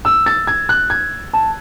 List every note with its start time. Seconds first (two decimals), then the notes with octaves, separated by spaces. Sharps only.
0.05 E6
0.26 A6
0.47 G#6
0.69 F#6
0.90 G#6
1.33 A5